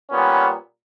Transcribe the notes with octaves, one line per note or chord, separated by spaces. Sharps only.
A#2 G3 B3 C#4